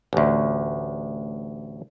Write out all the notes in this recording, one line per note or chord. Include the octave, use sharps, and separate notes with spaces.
A1 D2